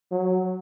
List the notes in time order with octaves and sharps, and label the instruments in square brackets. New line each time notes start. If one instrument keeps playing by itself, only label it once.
[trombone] F#3